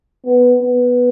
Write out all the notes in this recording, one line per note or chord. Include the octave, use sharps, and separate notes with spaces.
B3
B3